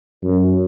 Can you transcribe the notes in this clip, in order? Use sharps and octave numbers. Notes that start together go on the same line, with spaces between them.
F#2